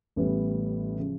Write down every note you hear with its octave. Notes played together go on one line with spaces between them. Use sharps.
A1 A2 E3 G3 B3
C#3 F3